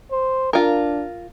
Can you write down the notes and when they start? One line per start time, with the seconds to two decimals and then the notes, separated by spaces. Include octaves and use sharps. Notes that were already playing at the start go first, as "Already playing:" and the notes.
0.12 C5
0.53 D4 F4 A#4